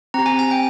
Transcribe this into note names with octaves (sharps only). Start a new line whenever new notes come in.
C4 G4 A#5
G#5
G#5
G5